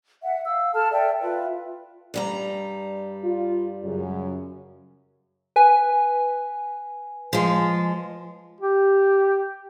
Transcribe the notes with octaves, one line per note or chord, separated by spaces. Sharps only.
E5 F#5
F5 E6
A4 A5 F6
A4 D5 E5 G5
F4 B4 E5
G2 G3 A#5
F4
F#2 C#3
B4 G#5
F3 G#3
G4